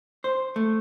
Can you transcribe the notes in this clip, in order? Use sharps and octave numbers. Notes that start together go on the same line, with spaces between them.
C5
A3